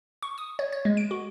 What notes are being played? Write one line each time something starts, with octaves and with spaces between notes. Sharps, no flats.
C#6
D#6
C#5
C#5
G#3
D7
F#4